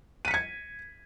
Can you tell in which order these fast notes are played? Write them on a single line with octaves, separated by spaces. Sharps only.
D#7 B6 C#7 G#6